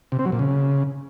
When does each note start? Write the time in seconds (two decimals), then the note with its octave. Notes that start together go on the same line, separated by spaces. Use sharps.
0.12 C3
0.19 C4
0.26 F#3
0.32 A#2
0.39 C#3